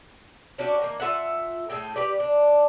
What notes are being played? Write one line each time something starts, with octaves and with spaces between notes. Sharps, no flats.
C#4 D4 F#4 G4
D#3 A#3
F4 A4 E5 F#5
A2 G#4 A4 G5
G4 B4 D5
D4